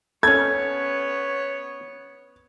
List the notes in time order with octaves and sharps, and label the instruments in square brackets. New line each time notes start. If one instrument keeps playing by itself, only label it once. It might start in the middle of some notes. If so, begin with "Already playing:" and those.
[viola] B3 C#5 [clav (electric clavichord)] C#4 A4 [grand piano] G#6